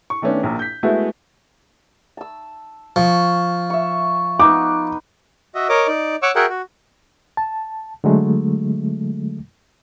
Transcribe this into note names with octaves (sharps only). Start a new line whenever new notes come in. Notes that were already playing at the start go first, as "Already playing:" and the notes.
C#6
D#3 A3 B3 C#4 D4
A#1 A#2 A#5
G6 B6
G#3 A3 B3 E4 F#4
A5 E6
F3 C#6 D#6
E5 C#6
B3 D#4 B4 D6
F#4 D#5 E5
A#4 C#5 D#5 D6
D#4 D5
C#5 F#5 C#6 D6 E6
F#4 G#4 A#4 E5 F#5 G5
F#4
A5
D3 F#3 G#3 A3